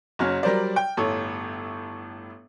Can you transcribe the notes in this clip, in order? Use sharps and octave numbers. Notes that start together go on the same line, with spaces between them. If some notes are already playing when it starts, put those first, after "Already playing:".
F#1 F#3 C#4 F6
F#3 G3 A#4 C5 D5
G5
G1 A2 A4 C#5